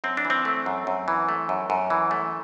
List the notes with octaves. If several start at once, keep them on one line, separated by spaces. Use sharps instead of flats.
F#2 C4
D4
E3
C4
A3
F#2
F#2
E3
A3
F#2
F#2
E3
A3